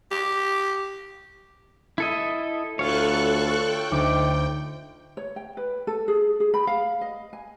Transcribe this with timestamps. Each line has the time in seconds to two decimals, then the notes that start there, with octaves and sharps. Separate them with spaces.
0.11 G4
1.98 E4 A4 D#5 E6
2.79 D2 F4 A4 C#5 C#6 F#6
3.62 G5
3.91 D2 D#4 D6
5.17 C#5
5.36 G5
5.57 B4
5.87 A4
6.08 G#4
6.40 G#4
6.54 B5
6.67 F5
7.01 D#5
7.33 G#5